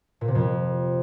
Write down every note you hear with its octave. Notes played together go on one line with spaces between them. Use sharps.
A#2
C3
F2